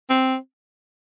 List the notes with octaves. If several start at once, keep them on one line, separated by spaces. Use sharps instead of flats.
C4